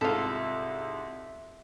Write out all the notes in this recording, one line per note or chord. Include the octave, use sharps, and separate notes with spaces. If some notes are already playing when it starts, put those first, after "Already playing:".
C2 G#2 F4 A4 E5